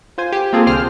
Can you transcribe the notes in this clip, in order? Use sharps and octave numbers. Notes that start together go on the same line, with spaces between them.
F4 C5 G#5
G4
A#3 C4 F4 G#4 A4
C2 D3 C5 G5 F6